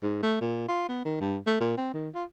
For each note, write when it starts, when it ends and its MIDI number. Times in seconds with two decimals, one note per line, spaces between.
0.03 0.18 44
0.23 0.37 57
0.41 0.64 46
0.69 0.84 65
0.89 1.03 59
1.05 1.18 51
1.20 1.37 43
1.46 1.58 57
1.60 1.76 46
1.77 1.92 60
1.94 2.09 51
2.15 2.24 65